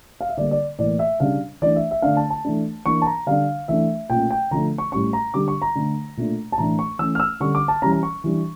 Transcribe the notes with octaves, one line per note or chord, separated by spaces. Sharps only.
F5
E5
D3 G3 A#3 D5
D5
A2 E3 A#3 D5
E5
C#3 G3 D4 F5
E3 A3 D4 D5
E5
E5
D3 A3 D4 F5
A5
A5
E3 A3 D4
E3 A#3 D4 C#6
A5
A#5
D3 G3 D4 F5
E3 A3 D4 E5
A#2 A3 C#4 G5
G5
D3 F3 A3 D4 A#5
C#6
A2 G3 C#4 C#6
A#5
D3 G3 D4 D6
C#6
A#5
D3 A3 D4
A#2 A3 D4
A5
A2 E3 A3 D4 A#5
C#6
E3 A3 C#4 E6
F6
E6
D3 G3 C#4 C#6
D6
A5
E3 G3 C#4 A#5
A#5
C#6
E3 G3 D4